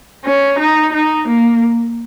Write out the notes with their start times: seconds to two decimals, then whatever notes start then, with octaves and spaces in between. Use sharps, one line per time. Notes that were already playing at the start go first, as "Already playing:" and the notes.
0.25 C#4
0.59 D#4
0.92 D#4
1.27 A#3